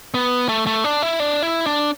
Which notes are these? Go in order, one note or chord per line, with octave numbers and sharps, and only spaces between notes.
B3
A3
A3
D4
E4
D4
E4
D4